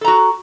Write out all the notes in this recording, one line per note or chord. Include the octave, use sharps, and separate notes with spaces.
F#4 A4 A#5